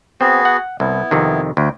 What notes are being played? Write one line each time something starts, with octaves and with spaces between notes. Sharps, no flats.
B3 C4 F#4 G#4
F#5
C2 B3 E4
F2 C3 D#3
D2 G5